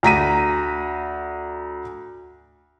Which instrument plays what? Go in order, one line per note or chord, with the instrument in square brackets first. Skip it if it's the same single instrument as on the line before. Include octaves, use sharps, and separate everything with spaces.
[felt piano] D2 A#5 B6 D#7